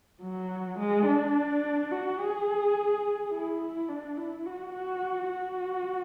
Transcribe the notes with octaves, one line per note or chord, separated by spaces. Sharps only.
F#3
G#3
D4
F#4
G#4
E4
D4
E4
F#4
F#4
F#4